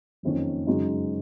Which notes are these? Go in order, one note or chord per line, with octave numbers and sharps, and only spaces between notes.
F#1 F2 D#3 A#3 C#4
F#2 C#3 G#3 D#4 F#4